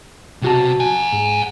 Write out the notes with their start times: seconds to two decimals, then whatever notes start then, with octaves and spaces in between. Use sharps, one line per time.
0.42 B1 C3 F#4 A5
0.80 F#5 G#5
1.12 G#2